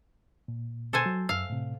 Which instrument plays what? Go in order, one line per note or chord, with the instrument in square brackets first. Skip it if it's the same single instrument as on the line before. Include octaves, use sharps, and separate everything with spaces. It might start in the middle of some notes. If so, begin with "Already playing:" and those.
[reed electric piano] A#2
[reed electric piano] B2 [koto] A4 C5 G#5
[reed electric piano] F#3
[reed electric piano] F#2 E6 [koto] F5
[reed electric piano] A2 C3